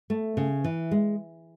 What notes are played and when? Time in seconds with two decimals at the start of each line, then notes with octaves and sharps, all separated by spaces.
0.10 A3
0.37 C#3
0.64 E3
0.91 G#3